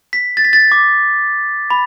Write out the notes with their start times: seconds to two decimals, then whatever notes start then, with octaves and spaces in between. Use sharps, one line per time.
0.13 B6
0.37 A6
0.45 B6
0.53 A6
0.72 D6
1.70 B5